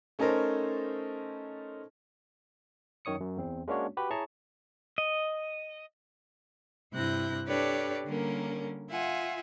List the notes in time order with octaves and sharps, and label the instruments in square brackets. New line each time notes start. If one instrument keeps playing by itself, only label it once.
[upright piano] A3 C#4 D#4 A4 A#4 C5
[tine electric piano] F#2 D#3 C#5 D#6 C#7
F#2
E2 C4
G#3 A#3 C#4 D4 F#4 C#5
F#4 G4 B4 B5
E4 G#4 C#5 A5 A#5 C#6
[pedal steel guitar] D#5
[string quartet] G2 C3 E4 F#6 G6 A#6
D4 G4 A4 B4 C#5 D5
D3 G3 A#3 C#4 A#4
F4 E5 F#5 G#5